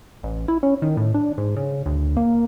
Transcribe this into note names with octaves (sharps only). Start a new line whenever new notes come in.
A1
E4
C#4
D#3
A2
D4
G#2
C#3
D2
A#3